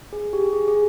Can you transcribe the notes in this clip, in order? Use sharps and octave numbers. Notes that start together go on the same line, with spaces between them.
G#4
G4
G#4
G#4